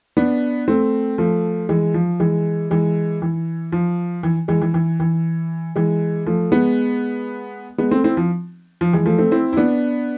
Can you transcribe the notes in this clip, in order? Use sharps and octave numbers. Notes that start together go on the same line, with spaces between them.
B3 D4
A3 C4
F3 A3
E3 G#3
F3
E3 G#3
E3 G#3
E3
F3
E3
E3 G#3
E3
E3
E3
E3 G#3
F3 A3
G#3 B3
G#3 B3
A3 C4
C4 E4
F3
F3
E3 G#3
F3 A3
A3 C4
C4 E4
E4
B3 D4